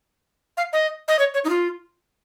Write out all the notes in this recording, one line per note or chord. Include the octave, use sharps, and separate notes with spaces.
F5
D#5
D#5
C#5
C#5
D#4
F4